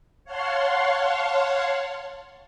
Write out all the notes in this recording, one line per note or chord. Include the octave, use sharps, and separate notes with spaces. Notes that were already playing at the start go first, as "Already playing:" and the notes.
C#5 F5 F#5 A5 C6